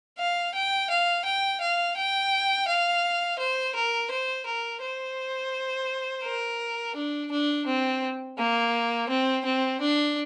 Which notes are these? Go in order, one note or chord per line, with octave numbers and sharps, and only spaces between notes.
F5
G5
F5
G5
F5
G5
F5
C5
A#4
C5
A#4
C5
A#4
D4
D4
C4
A#3
C4
C4
D4